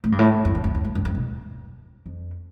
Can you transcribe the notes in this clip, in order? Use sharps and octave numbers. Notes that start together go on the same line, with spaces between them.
A2
G2
A2
F2
E2
F2
E2
G2
G2
F2
B2
F2